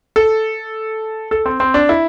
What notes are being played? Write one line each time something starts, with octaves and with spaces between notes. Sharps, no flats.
A4
A4
C4
C4
D4
E4